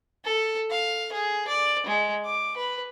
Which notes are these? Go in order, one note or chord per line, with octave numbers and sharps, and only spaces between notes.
A4
F5
G#4
D5
G#3
D6
B4